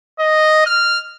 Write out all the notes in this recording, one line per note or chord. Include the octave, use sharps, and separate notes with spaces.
D#5
F6